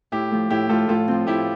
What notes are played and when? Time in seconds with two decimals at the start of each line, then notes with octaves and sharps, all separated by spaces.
0.12 A2 E4 G4
0.31 F3 A3
0.50 A2 E4 G4
0.69 F3 A3 F4 A4
0.89 A2 F4 A4
1.08 F3 C4
1.27 A2 E4 G4